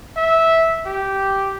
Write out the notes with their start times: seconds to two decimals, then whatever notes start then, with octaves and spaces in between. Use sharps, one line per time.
0.17 E5
0.86 G4